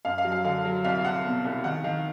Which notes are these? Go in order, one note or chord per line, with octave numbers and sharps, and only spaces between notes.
F#2 F5
F5
F#3
F5
D3 F5
F#3
C2 F5
C2 F#5
B2
C2
D#3 F#5
D#3 F5